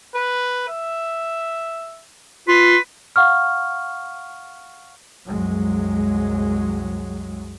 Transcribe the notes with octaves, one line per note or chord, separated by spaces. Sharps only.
B4
E5
F4 B4 C6
F5 F#5 C#6 F6
C2 F#2 F#3 G#3